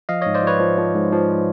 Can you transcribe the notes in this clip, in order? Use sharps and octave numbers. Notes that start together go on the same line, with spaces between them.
F3 D#5 F5
G#2 C#5 D#5
C5 D5
F3 B4 C#5
F3
F3
G#2
F3